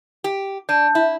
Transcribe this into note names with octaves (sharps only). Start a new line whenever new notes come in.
G4
D4 A5 G6
E4